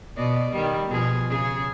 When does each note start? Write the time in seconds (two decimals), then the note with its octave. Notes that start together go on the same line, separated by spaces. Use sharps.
0.17 B2 D5 D#5
0.52 D#3 G3
0.88 B2 F3 G#4
1.30 C#3 G#4